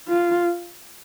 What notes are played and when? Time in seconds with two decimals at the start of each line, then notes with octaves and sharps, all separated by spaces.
0.08 F4